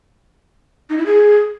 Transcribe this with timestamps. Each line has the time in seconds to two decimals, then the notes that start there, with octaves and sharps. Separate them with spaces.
0.90 D#4
0.98 E4
1.06 G#4